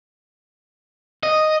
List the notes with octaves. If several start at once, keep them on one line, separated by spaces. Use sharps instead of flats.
D#5